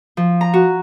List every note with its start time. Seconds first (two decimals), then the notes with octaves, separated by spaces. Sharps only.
0.17 F3
0.41 A#5
0.54 F#4